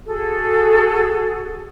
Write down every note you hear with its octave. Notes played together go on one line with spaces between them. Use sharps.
F#4 G#4 A4